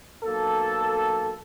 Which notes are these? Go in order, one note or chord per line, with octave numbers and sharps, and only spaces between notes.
B1 A#3 A4